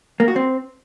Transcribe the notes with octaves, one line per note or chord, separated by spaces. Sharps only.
A#3
F#4
C4